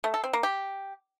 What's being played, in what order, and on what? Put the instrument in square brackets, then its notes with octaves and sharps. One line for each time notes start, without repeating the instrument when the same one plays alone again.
[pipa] A3
A4
C4
A#3
G4